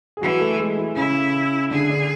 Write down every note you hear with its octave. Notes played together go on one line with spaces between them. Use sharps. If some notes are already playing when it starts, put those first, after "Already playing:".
G#4
E3 F#3 F#4
A3 A4
G#3 G#4
E3 E4
C#3 C#4 E4
D3 D4 G#4
D3 D4